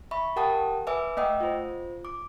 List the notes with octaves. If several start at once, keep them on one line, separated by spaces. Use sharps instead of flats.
E5 B5 C#6
G4 A#4 F#5 G5 A5 D#6
B4 E5 G#5 D6 E6
A3 D#5 F#5 G5 D#6 E6
F4 C5
D6